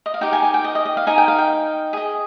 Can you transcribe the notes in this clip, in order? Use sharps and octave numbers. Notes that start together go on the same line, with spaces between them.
D#5
F5
D#4 G4 A#4 G5
G#5
G#5
G5
D#5
D#5
D#5
F5
D#4 A#4 D#5 G#5
G5
F5
G5
G#4 D#5